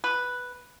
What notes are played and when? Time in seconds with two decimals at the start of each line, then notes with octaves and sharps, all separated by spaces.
0.04 B4